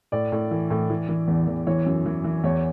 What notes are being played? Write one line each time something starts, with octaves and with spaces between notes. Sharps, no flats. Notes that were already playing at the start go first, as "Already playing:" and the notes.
A2 D5
A2
E3
A2
E3
E3
E2
E2
E3 C#5
F#2
E3
E3
E2 C#5